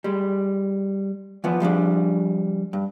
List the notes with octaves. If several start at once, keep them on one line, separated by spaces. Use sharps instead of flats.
G3 G#3
E3 F3 B3 F#5
F3 G3 G#3 D4
G2